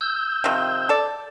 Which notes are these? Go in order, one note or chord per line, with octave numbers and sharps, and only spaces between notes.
E6 G6
C3 D#3 F3
A4 D5